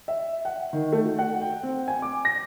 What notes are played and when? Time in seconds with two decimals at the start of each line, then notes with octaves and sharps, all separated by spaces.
0.08 E5
0.45 F#5
0.73 D#3
0.92 A3
1.05 F#4
1.19 F#5
1.41 G5
1.63 C4
1.88 G#5
2.02 D6
2.25 A#6